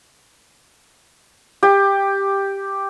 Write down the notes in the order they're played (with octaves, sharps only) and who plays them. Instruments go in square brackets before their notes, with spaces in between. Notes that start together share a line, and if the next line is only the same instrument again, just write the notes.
[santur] G4